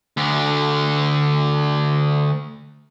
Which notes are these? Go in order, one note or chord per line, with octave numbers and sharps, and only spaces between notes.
D2 D3